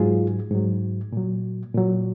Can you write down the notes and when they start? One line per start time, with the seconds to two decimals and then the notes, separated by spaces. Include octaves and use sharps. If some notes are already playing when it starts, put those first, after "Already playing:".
Already playing: G#2 F#3 F4 G#4
0.51 G#2 F#3
1.12 A#2 F#3
1.74 A#2 F#3